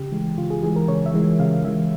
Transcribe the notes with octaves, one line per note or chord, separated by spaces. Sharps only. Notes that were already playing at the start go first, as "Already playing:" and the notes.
Already playing: C#3 G4
E3 G#3
C#3 F4
G#4
E3 G#3 G#4
A#4
C#3 C#5
E5
E3 G#3
C#3 F5
E3 G#3 E5